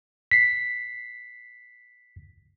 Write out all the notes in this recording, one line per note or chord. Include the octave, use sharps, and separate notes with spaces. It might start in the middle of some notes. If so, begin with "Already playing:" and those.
B6 C7